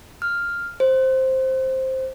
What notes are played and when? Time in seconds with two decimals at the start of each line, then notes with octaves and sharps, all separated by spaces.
0.22 F6
0.80 C5